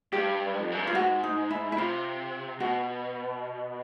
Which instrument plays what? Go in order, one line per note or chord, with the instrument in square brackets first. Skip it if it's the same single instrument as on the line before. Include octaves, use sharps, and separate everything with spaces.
[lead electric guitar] G2 [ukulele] G4
[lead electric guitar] F2
F#2
[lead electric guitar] G2 [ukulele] F4
[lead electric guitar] G#2 [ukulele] F#4
[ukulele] D#4
E4
E4
[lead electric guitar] C3 [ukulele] F4
[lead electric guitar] B2 [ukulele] F#4